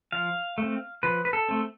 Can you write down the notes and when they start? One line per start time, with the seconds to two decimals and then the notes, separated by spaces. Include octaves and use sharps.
0.12 F3 F5
0.58 A3 C4
1.03 F3 B4
1.25 B4
1.33 A4
1.49 A3 C4